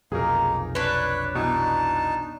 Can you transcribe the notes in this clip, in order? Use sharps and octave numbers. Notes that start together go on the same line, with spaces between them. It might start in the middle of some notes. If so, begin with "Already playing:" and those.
F1 B1 A#3 D#4 G#4 A#4
D4 B4 C#5
B2 E3 D#4 A5